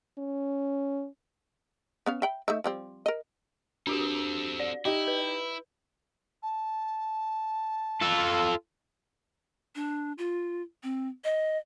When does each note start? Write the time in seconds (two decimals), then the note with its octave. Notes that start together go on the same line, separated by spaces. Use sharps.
0.18 C#4
2.06 B3 C#4 F5
2.22 E5 G5 B5
2.48 A3 D#4 E5
2.64 F3 G3 C4
3.06 A#4 D#5
3.87 C4 D4 F#4 G4 A4
4.60 D5
4.85 D#4 E4 G4
5.08 B4
6.43 A5
8.02 F4 A4
9.75 D4
10.18 F4
10.83 C4
11.24 D#5